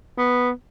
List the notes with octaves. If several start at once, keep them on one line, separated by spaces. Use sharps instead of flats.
B3